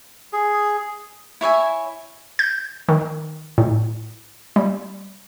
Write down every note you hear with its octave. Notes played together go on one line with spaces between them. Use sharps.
G#4
E4 C#5 E5 G#5
G6
D#3
A2
G3